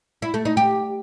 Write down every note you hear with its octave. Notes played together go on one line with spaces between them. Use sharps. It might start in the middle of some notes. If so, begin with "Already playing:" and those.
E4
A3
D#4
G4